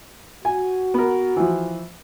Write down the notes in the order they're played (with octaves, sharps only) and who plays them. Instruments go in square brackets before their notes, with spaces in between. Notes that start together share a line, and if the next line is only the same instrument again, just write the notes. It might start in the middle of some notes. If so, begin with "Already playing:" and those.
[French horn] F#4 [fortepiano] G#5
[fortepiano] B3 A#4
E3 F3